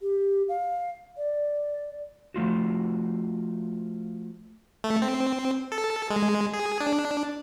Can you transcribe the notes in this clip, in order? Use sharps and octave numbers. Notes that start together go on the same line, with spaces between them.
G4
F5
D5
F3 A3 F4 F#4
A3
C4
A4
G#3
G#4
D4